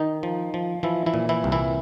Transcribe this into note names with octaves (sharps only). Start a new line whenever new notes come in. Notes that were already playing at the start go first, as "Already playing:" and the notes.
Already playing: D#3 D#4
F3
F3
E3 F3 E4
E3 E4
A#2
E3 E4
C2
E3 E4